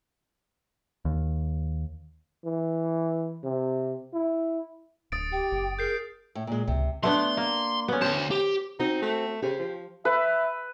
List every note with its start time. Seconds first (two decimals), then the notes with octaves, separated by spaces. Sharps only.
1.05 D#2
2.45 E3
3.44 C3
4.13 E4
5.12 D1 D#6 A6 D7
5.32 G4 G5
5.52 F#1
5.79 G#4 A#4 G6 C7
6.35 A2
6.47 A#2 G#3
6.67 G#1 C#2 C3
7.03 A3 B3 D4 C6
7.37 A#3
7.88 B3 C#4
8.02 D2 C5 A5
8.31 G4
8.80 C4 D#4 F#4
9.02 A3
9.42 C#3 G4 C5
9.58 F3
10.05 B4 E5